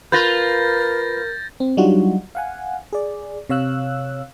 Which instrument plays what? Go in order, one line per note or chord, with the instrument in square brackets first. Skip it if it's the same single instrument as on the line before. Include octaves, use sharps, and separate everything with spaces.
[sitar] F4 B4 [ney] A#4 [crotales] G6 A6 A#6
[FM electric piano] C4
F#3 G3 D4 D#4 F4 F#4
F5 F#5 G#5
G#4 D5
C3 C#5 F5 E6 F#6